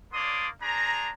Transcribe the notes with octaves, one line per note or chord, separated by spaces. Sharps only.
A#3 D4 C#5 D5 C6 D#6
D4 G#4 C5 A#5